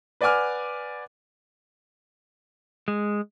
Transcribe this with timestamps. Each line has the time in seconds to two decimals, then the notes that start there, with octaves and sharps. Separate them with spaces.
0.21 B4 D5 F#5 G#5 D6 F6
2.88 G#3